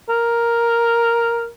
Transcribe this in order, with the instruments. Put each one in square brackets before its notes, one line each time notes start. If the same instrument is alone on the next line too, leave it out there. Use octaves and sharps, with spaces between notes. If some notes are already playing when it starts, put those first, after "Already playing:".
[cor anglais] A#4